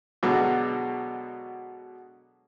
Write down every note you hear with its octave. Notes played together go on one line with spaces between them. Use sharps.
B2 D3 F#3 G#3 B3